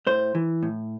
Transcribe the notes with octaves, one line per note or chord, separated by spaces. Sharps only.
A2 C5
E3
A2